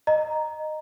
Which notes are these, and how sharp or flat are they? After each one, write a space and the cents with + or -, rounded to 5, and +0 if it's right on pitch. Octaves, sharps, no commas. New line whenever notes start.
D#5 -10 A#5 +0